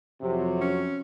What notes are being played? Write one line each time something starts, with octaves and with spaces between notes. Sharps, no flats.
F2 C3 F#3
C#4